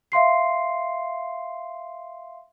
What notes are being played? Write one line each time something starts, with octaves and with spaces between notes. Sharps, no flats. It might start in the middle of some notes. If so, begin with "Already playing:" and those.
E5 F5 C6 C7